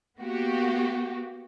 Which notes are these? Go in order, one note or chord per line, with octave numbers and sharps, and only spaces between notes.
A#3 B3 F#4 G4